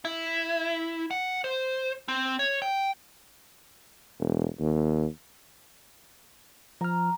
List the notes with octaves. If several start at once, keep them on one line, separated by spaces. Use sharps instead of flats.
E4
F#5
C5
C4
C#5
G5
E1
D#2
F3 A#5 F6